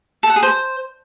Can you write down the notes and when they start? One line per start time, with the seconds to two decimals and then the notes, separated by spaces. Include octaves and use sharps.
0.23 A4
0.30 F#5
0.36 G#4
0.43 C5